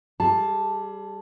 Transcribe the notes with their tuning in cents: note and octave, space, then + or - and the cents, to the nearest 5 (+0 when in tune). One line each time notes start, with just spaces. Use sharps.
G3 +0 G#4 +30 A5 +0